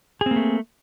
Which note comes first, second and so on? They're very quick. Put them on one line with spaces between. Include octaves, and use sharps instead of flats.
G#4 C4 A#3 A3